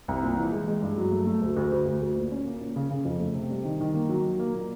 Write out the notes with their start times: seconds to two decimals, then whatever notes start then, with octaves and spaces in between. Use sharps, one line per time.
0.08 C2
0.23 A#2
0.37 E3
0.52 G#3
0.68 G#3
0.82 G2
0.98 F#3
1.12 A3
1.27 A3
1.42 D2
1.56 D2
1.72 D2
1.86 D2
2.02 D2
2.16 A#2
2.32 C#4
2.45 A#3
2.61 A#2
2.76 C#3
2.90 C#3
3.05 F2
3.20 A3
3.35 C3
3.51 G3
3.64 D#3
3.80 D#3
3.94 A#3
4.09 F#3
4.25 F#3
4.39 A#3
4.54 A#2